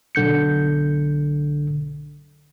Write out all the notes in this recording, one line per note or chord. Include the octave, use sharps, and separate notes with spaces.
B1 D3 G6 C#7